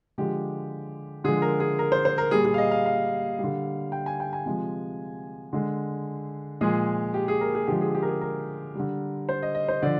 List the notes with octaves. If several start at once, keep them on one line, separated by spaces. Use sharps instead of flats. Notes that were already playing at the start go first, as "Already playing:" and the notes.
D3 F3 G#3 G4
D3 F3 G#3 G#4
A#4
G#4
A#4
C5
C5
A#4
A#2 G3 G#4
G#4
F5
D#5
F5
F5
D3 G3
G5
G#5
G5
G#5
C3 F3 G#3
D3 G#3
A#2 F3 G#3 G#4
G4
G#4
A#4
G#4
D3 F3 G#3 G4
G#4
G4
A#4
G#4
A#4
D3 G3
C5
D#5
D#5
C5
D3 F3 D5